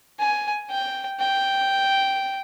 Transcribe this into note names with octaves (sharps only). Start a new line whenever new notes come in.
G#5
G5
G5